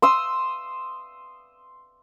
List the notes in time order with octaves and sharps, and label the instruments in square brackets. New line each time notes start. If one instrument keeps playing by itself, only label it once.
[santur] C6 D#6 E6